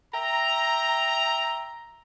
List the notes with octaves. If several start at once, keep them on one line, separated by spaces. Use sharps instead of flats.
E5 G5 A#5